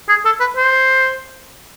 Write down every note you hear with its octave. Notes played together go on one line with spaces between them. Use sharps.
G#4
A4
B4
C5